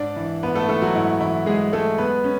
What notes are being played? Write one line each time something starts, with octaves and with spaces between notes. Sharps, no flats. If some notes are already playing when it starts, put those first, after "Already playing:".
Already playing: G#2 D4 D5
E3
G#2 B3 B4
A3 A4
E3 A3 A4
F#3 F#4
G#2 E4
E3 E4
G#2 G#3 G#4
G#3 A3 A4
G#3 B3 B4
C#4